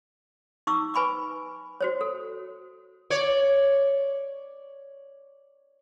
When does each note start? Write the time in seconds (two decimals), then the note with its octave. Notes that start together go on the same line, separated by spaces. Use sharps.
0.67 D#4 C#6 D6 E6
0.94 B4 G#5 B5 C#6 D6
1.81 F#4 C5 C#5
2.01 A4
3.10 C#5 D5